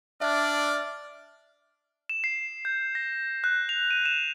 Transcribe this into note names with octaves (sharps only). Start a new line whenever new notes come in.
D4 D5 E5 F6 A6
E7
C7
G6
A#6
F#6
F7
D#7
E7